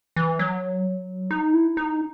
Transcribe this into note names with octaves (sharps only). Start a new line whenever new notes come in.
E3
F#3
D#4
E4
D#4